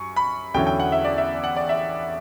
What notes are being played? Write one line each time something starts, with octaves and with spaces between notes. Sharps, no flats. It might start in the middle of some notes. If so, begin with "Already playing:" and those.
Already playing: F#2 C#6
B5
E2 D3 F#3 C#4 E4 G5
G5
F#5
E5
D5
E5
F#5
D5
E5